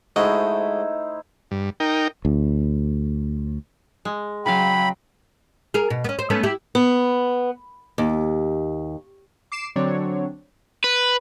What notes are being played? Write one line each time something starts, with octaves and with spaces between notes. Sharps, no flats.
G#2 A3 D#4 E4 F#4 C5 D#5
G2
D#4 A#4 G5
D2
G#3
C#3 F#3 F5 G5 B5
G#4 A#4
B2
B3 C#4
C5
A3 B3 C#4
E4 G4
B3
D#2
D6 C7 D7 E7
D3 F#3 C4 D4 C#5
B4